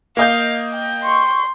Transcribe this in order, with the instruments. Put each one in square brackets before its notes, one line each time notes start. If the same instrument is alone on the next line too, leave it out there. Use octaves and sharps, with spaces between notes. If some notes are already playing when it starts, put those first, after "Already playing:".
[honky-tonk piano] A#3 D#5 G6 [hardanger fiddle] F5
[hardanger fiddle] G5
[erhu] C6 [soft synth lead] C#6